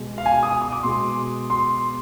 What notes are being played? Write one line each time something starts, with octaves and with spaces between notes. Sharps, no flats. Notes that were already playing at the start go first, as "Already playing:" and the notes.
Already playing: B2 G#3
F5
G#5
D#6
D#6
D6
B2 G#3 C6
C6